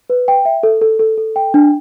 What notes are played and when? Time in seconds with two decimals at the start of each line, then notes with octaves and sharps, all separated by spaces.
0.10 B4
0.28 G5
0.45 E5
0.63 A4
0.81 A4
0.99 A4
1.17 A4
1.36 G5
1.54 D4